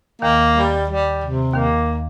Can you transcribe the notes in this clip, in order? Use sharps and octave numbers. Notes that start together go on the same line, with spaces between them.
D#2 D#3 A#3
G3
G3
C3
D#2 D#3 A#3